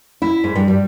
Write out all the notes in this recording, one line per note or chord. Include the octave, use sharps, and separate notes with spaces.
E4
G#2
G2
G3